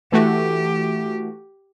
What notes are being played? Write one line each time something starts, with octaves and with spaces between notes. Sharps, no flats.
E3 A3 F#4 G4